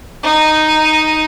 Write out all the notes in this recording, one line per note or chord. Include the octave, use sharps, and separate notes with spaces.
D#4